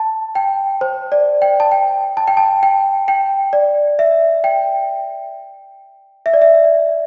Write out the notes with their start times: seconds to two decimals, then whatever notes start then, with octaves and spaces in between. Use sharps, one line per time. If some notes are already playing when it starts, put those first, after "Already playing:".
Already playing: A5
0.35 G5
0.81 C5
1.12 D5
1.42 G5
1.60 A5
1.72 G5
2.17 A5
2.28 G5
2.37 A5
2.63 G5
3.08 G5
3.53 D5
3.99 E5
4.44 G5
6.26 E5
6.34 D5
6.42 E5